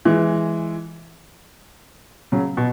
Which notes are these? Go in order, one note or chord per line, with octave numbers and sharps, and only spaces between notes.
E3 G#3
C#3 F#3
B2